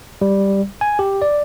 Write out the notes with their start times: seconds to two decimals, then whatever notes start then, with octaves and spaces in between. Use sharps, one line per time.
0.21 G3
0.81 G#5
0.99 G4
1.22 D5